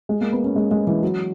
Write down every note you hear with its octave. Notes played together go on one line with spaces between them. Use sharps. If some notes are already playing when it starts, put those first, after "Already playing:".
G#3
A#3
B3
C#4
G#3
G#3
E3
F#3